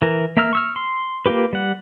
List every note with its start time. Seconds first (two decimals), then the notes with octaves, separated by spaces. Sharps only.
0.02 E3 A#4
0.37 A#3 E5 A#5 E6 F6
0.53 C#6 E6 F6
0.76 C6
1.26 A#3 C4 F4 G4 B4
1.53 G3 F#5